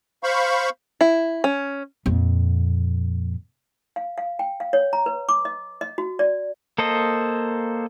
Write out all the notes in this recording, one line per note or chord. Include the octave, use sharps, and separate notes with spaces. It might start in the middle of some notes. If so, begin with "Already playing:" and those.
C5 F5 B5 C#6
E4
C#4
F2 A#2
F5
F5
G5
F5
C#5
A#5
B4
D6
D#5
D#5
F#4
D5
A#3 A4 C5 D#5